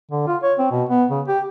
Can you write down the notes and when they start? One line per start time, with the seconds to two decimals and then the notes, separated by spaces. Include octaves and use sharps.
0.12 D3
0.27 F4
0.43 C#5
0.59 C4
0.72 B2
0.89 B3
1.11 C#3
1.28 G4